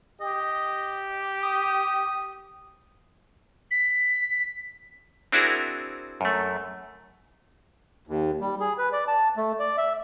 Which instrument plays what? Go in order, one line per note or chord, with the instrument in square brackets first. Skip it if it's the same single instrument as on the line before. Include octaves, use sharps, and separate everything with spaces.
[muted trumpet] G4 [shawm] D#5
[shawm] D#6
[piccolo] B6
[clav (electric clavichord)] C4 D4 E4 F#4 G#4 A#4
F#2 A3
[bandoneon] D#2
G3
G#4
B4
D5
A5
A3
D5
E5